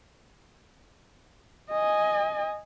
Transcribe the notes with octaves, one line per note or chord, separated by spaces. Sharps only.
D#5 G#5